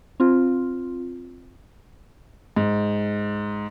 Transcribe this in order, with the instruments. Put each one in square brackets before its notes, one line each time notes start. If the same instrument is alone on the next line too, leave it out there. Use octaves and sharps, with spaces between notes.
[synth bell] C4 F4
[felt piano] G#2